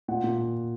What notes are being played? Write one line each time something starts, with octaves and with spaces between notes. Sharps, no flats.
A#2 F#5
A#2